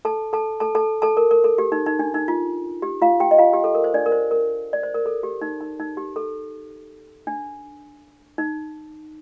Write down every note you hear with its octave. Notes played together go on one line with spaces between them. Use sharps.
A4 A5
A4 A5
A4 A5
A4 A5
A4 A5
A#4
A#4
A4
G4
D#4
D#4
D4
D#4
F4
G4
F4 F5
G4 G5
D#5
F4 F5
G4
A4
A#4
C5
D4 D5
A#4
C5
A#4
D5
C5
A#4
A4
G4
D#4
D#4
D#4
G4
A4
D4
D#4